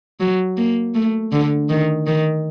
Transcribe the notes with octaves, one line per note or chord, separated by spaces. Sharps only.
F#3
A#3
A3
D3
D#3
D#3